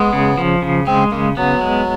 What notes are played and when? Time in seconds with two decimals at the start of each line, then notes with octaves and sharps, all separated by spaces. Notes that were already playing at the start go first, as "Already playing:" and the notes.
Already playing: G#3 B3
0.13 C#3
0.37 F3
0.62 C#3
0.87 G#3 C4
1.11 C#3 A#3
1.37 F#3 B3
1.61 G#3